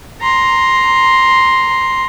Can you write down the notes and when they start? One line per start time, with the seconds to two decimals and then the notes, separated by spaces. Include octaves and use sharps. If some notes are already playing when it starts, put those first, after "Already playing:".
0.21 A#5 C6